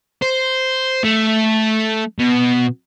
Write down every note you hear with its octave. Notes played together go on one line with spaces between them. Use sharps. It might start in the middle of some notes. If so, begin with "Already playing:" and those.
C5
A3
B2